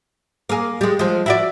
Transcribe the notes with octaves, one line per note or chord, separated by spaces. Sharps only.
A#3 G#4
G3 G#3
F3 G#3
E4 F#4 D5